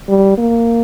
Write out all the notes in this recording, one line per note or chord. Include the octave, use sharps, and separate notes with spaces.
G3
A#3